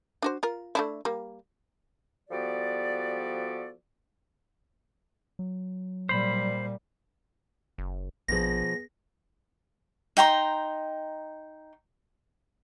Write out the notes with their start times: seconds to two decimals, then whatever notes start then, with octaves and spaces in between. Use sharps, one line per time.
0.22 D4 F#4 C5
0.43 F4 A#4
0.75 A3 D4 E4
1.05 G3 A#3
2.31 F3 G3 B3 F#4 A4 D5
5.39 F#3
6.09 A#2 G3 C5 B5
7.78 F#1
8.28 A#1 B2 F3 B3 G#4 A#6
10.17 D#4 G5 A#5 C6